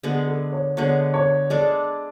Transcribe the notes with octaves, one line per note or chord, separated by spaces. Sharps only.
D3 G#3 B3
A4
C#5
D3 G#3 B3 C#5
C#5
G#3 D4 A4 D5